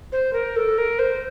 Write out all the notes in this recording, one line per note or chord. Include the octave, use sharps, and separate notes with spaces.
C5
A#4
A4
A#4
C5